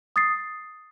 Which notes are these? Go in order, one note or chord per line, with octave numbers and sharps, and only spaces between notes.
D#6 A6 C7